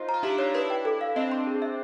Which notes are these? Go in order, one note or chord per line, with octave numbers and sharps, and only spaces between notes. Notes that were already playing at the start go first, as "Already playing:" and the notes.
Already playing: D#4 F4 C5
A#5
F4
D4 E4 G4
D#4 F4 C#5
D4 E4 B4
G5
A4
F5
C4 D4 D#5
C6
G#4
E5